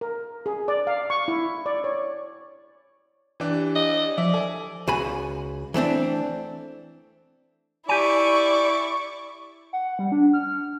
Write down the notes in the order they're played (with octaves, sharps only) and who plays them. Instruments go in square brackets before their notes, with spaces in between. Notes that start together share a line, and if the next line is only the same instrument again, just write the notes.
[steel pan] A#4
G#4
D5
F5
C#6
E4
D5
C#5
[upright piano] E3 D4 [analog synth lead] G4
[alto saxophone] D#5
[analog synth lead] F3 [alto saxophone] D5 [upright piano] E5
[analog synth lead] A4 [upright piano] G#5
[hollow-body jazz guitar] C#2 F#4 G#5 B5
E3 A3 C4 D4
[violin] E4 C#6 [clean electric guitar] G4 G#5 [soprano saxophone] D5
[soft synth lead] F#5
G3
D4
F6